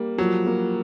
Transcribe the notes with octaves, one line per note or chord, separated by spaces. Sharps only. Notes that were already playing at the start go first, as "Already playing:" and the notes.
Already playing: G3 A#3
F3 F#3
A#3